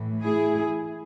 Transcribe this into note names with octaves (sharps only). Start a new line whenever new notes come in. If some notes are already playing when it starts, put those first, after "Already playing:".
Already playing: A2 E3
E4 G#4